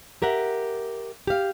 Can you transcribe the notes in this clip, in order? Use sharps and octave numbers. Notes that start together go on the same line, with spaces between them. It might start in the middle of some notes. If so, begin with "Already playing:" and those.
G4 A#4 E5 F#5
G4 F5